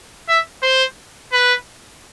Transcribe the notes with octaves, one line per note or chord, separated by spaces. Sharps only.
E5
C5
B4